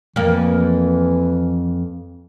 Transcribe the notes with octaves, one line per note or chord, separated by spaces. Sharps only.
F2 E3 A#3